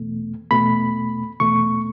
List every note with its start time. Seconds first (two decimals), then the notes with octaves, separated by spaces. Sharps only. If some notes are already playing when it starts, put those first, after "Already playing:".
Already playing: E2 B2 A3
0.51 E2 B2 A3 B5
1.40 E2 B2 A3 C#6